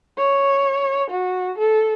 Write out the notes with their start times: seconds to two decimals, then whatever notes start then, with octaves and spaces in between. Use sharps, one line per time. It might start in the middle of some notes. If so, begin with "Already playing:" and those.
0.18 C#5
1.11 F#4
1.58 A4